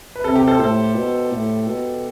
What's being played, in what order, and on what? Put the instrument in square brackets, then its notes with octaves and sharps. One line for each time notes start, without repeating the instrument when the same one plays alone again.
[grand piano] B4
[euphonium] C3 [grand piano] A4
[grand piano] G4
A4 C5
[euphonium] A2 [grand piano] A4 C5
[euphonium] B2
A2
B2